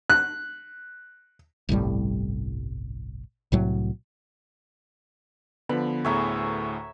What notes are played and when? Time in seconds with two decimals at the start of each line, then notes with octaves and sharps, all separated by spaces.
0.10 F#6
1.69 G1 C2 A2 G3
3.52 C2 A2 F#3
5.69 D3 F3 B3 B5
6.05 D2 A2 G#4 C#5 E5 A#5